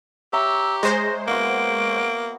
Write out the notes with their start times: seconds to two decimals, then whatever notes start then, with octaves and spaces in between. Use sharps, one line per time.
0.33 G4 C#5 E5 A#5 E6
0.83 G#3 C5 A#6
1.27 A#3 B3 F#4 D7